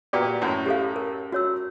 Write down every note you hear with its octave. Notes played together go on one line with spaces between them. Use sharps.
A#2 F#4 G4 B4 D5
F#2 A2
G4 A4 F5
A#4
F#4 C#5 E6